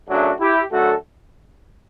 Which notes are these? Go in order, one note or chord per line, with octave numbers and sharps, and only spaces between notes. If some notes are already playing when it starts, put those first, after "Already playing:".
F#2 C#3 F#3 A3 D4 F#4
E4 G4
F#2 D3 A3 F#4 A4